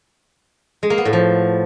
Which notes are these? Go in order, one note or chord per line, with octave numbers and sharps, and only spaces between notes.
G#3
A#3
B3
A2
F3